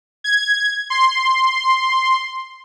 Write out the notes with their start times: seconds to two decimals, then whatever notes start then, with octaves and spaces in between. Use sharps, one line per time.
0.24 G#6
0.90 C6